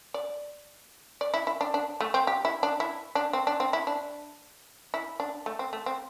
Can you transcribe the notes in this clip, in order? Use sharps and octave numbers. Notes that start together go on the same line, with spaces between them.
D5
D5
E4
E4
D4
D4
A3
C4
G4
E4
D4
E4
D4
C4
D4
C4
E4
D4
E4
D4
A3
C4
A3
C4